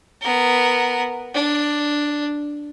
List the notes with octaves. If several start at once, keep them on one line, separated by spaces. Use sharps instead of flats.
B3 A#4
D4